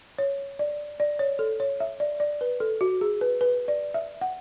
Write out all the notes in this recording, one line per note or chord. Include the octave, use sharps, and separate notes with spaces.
C#5
D5
D5
C#5
A4
C#5
E5
D5
D5
B4
A4
F#4
G#4
B4
B4
D5
E5
F#5